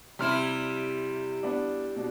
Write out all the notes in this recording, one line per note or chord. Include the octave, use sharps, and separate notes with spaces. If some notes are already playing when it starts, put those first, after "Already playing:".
C3 G3 E4 C6 F6
B3 D4
B2 D4